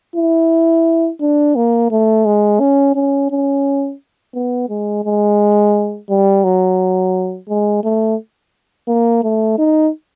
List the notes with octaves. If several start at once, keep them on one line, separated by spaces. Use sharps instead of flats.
E4
D4
A#3
A3
G#3
C#4
C#4
C#4
B3
G#3
G#3
G3
F#3
G#3
A3
A#3
A3
D#4